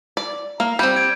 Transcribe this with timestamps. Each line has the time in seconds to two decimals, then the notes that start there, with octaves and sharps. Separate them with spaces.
0.17 D5
0.60 A#3
0.79 G3 C4 G6
0.96 G#6 D7